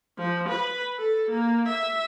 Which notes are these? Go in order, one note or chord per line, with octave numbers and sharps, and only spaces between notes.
F3
B4
A4
A#3
E5